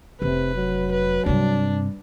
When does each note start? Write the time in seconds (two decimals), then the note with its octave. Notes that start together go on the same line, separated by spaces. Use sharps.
0.22 F1 C3 B4
0.55 F#3
0.92 B4
1.26 G2 C3 D4